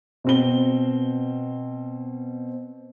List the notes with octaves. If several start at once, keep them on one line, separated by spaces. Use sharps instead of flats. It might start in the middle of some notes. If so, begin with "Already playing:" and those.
B2 C4 G7